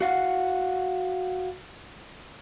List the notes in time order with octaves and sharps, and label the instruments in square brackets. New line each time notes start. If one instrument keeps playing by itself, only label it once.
[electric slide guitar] F#4 F5 F#5